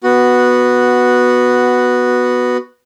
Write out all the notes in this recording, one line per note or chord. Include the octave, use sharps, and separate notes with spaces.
B3 F#4